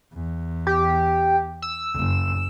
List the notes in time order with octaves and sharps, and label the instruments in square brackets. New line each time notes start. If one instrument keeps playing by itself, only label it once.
[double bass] E2
[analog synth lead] G4
E6
[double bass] F#1